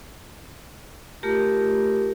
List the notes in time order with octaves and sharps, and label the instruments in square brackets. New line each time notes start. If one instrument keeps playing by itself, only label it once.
[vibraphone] A3 F4 G4 A#4 A#5